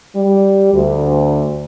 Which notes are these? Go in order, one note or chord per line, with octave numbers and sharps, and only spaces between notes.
G3
D2